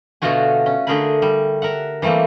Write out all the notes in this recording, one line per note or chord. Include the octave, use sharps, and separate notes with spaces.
B2 D3 A3 F4 F#4 G#5
C#4
D3 A3 G#4 A#4 G#5 B5
G3
A#4 E5 F#5
E3 G3 A3 A#3 C4